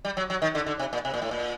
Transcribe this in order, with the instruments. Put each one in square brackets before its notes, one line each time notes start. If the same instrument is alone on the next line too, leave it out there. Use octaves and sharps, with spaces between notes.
[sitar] G3
F#3
F#3
D#3
D3
D3
C3
A#2
C3
A#2
A2
A#2